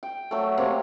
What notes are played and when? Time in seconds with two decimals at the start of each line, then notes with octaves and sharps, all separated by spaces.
0.03 G5
0.31 F#3 A3
0.58 C3 A#3 C#5